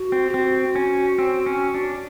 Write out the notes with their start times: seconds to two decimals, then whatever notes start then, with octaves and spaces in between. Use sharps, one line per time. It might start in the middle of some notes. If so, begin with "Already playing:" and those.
Already playing: F#4
0.12 C4
0.28 G4
0.34 C4 F#4
0.75 C#4
1.19 C4
1.46 C#4
1.75 D4